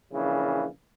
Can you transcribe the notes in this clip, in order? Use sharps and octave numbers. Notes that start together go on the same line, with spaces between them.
A#1 C#3 E3